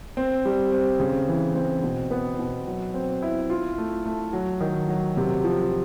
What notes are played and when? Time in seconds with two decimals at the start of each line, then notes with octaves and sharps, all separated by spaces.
0.17 C4
0.45 G3
0.72 C4
1.00 C#3
1.28 E3
1.55 C4
1.84 B2
2.11 B3
2.39 B2
2.67 F#3
2.94 C4
3.22 E4
3.50 F4
3.78 A3
4.05 A3
4.33 F#3
4.60 D#3
4.89 F#3
5.17 C3
5.44 F3